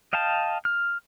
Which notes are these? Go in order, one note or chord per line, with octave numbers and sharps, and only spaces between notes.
D#5 F5 G5 A5
F6